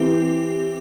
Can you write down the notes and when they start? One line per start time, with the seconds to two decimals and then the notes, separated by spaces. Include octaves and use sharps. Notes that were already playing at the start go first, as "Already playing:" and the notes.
Already playing: E3 C4 G4